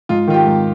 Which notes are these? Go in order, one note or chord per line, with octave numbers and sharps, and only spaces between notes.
G#2 F4
D#3 F4
G4
G#2